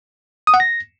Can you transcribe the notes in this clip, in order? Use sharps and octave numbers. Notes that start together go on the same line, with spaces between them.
D#6
F#5
A#6